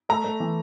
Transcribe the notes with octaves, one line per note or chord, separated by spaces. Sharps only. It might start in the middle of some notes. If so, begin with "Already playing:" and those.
A3 A#5
A3
E3